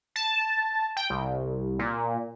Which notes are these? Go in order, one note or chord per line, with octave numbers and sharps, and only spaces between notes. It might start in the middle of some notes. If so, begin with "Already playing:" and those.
A5
G5
C2
A#2